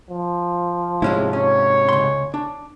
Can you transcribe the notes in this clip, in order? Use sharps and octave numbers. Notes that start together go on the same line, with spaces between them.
F3
G#2 C3 G#3 C#4 E4
C#4 C#5
C#2 C6
D4